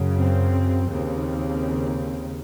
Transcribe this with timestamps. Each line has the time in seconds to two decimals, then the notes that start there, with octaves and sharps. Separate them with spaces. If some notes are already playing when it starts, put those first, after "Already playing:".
Already playing: F#2 C#3
0.18 C4
0.90 D#2 C#3 C4